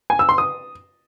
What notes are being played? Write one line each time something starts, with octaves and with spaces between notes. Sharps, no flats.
G#5
E6
C6
D#6